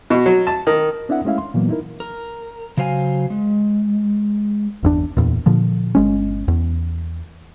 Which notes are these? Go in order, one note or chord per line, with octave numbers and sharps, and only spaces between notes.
B2
F#3
A5
D#3
C4 D4 E4 E5 F#5
G#3 A3 C#4 E4 E5 F5
C6
A#2 E3 F#3 A#3 B3
D#4 E4 A#4
A#4
C#3 F#3 C5 F5 G#5
G#3
G1 E2 D4
D1 A1 E2 A#2
A#2 D3 F3
G1 G#3 C#4
E2